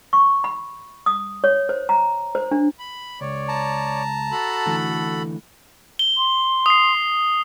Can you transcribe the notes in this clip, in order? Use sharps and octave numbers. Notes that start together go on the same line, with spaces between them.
C#6
B5
D#6
C#5
C5
A#5
C5
D4
B5
C#2 C#5 D5
A5 A#5
F#4 A4 B5
D3 E3 A3
G7
C6
D#6 C7